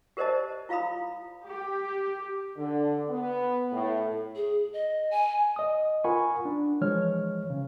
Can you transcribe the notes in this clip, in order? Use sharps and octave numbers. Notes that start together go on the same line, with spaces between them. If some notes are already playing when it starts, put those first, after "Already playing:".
G4 A#4 C5 D5 D#5 A5
E4 F4 F5 A#5 B5 D#6
G4
D3
B3
A2
G#4
D#5
G#5
D#5 D#6
F4 A#4 F#5 G#5 B5 C#6
D4
E3 F3 G#3 C#5 F6
C#3